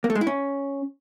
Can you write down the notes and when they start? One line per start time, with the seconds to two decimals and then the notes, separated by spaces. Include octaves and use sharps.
0.04 A#3
0.10 A3
0.15 G#3
0.21 E4
0.27 C#4